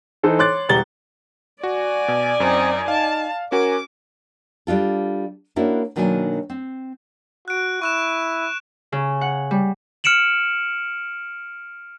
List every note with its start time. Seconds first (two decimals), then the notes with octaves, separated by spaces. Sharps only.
0.23 E3 D#4 A4 C5
0.39 C#5 C6 D6 F#6 A6
0.69 E1 G3 A#5 A6 G7
1.63 F#4 D5 G#5
2.08 B2
2.40 F#2 C4 D#4
2.88 D#4 F5 A5
3.52 C#4 F#4 A#4 G#5 D6
4.67 G3 D4 F4 A4
5.56 A#3 C#4 D4 E4 F#4
5.96 B2 D#3 F#3 A#3 D4 G#5
6.50 C4
7.48 F#4 F#6 D7
7.82 E4 C#6 F#6 E7
8.92 C#3
9.21 F#5
9.51 G3
10.04 F6 C#7 D7 E7 F#7